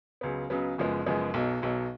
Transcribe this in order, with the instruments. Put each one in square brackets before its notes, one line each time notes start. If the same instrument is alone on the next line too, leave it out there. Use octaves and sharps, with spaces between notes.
[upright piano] C#2 C#3 F#3 B3
C#2 C#3 F#3 B3
F#1 F#2 F3 G#3 B3
F#1 F#2 F3 G#3 B3
B1 B2 F#3
B1 B2 F#3